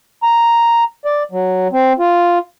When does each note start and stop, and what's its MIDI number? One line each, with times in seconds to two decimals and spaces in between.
0.23 0.83 82
1.05 1.23 74
1.32 1.68 54
1.72 1.93 60
1.99 2.38 65